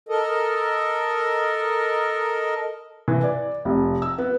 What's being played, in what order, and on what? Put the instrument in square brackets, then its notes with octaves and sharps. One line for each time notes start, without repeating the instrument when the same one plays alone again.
[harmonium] A4 A#4 D#5
[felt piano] E3
D5
F1
E6
B3